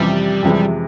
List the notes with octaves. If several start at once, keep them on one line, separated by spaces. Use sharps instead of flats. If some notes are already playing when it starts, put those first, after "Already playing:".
Already playing: F2 C3 E3 G3
F2 C3 E3 G#3